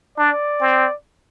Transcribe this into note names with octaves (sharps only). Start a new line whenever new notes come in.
D4 D5
C4